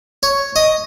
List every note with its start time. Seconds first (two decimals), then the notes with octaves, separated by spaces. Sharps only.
0.23 C#5
0.56 D#5